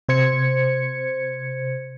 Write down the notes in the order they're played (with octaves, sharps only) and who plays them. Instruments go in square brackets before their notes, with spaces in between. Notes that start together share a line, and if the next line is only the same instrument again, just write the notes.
[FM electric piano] C3 C5 G#6 C#7